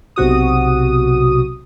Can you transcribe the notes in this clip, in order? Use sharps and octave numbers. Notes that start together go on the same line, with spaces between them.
B1 C3 F#4 D#6